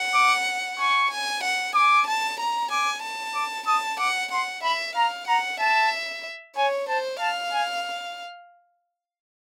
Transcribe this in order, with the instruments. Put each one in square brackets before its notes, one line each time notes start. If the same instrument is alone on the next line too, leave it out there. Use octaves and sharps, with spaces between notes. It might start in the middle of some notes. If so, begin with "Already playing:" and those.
Already playing: [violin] F#5
[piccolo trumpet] D6
[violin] G#5 [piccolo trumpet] C#6
[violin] G#5
F#5
[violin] G#5 [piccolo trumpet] D6
[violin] A5
A#5
[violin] G#5 [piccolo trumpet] D6
[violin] A5
[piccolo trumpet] D6
[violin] A5 [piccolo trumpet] D#6
[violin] F#5 [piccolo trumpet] D6
[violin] F#5 [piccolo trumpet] C6
[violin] E5 [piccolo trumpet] B5
[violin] F5 [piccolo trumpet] A#5
[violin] F#5 [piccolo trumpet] A#5
[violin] E5 [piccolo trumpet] A5
[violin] C#5 [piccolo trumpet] G#5
[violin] C5 [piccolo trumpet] A5
[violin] F5 [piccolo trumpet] A5
[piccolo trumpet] G#5